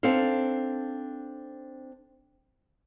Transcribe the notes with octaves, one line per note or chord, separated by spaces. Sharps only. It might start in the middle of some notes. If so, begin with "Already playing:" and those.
C4 D4 D#4 A4 F5